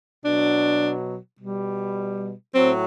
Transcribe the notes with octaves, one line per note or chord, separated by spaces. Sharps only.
B2 F#3 D4
B2 G3
A2 F#3 C4